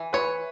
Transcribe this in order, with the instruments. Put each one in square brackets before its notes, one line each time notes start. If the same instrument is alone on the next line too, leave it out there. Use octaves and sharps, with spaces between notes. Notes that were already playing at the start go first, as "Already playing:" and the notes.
Already playing: [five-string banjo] E3
[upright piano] B4 [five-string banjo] C#5